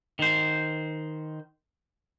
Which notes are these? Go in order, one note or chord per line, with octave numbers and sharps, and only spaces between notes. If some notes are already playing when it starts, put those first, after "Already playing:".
D#3 C5